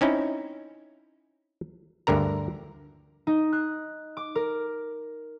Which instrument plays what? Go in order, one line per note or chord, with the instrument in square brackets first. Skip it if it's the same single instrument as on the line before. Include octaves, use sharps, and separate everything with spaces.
[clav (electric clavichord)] C4 C#4 D#4 E4
D2 G2 D3 A#4 A#5
[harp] D#4
F#6
D6
A#4